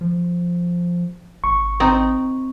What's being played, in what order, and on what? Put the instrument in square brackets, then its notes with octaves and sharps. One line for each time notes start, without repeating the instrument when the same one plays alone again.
[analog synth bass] F3
[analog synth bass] G#1 [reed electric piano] C#6
[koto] C4 D#4